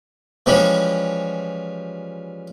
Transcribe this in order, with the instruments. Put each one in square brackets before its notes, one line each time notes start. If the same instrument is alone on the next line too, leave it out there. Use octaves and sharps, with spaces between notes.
[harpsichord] E3 F3 G3 G#3 C#4